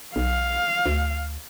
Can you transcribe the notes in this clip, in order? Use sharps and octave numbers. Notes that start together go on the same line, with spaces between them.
B1 F5
D2